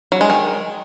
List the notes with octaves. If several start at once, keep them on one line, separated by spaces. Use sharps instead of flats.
F#3
G#3
D#3